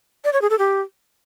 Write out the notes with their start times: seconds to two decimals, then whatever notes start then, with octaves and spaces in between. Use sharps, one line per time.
0.25 D5
0.33 C#5
0.42 G#4
0.50 A4
0.59 G4